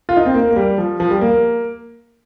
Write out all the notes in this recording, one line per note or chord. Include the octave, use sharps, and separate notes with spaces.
F4
D#4
C4
A#3
A#3
G3
F3
F3
G3
A#3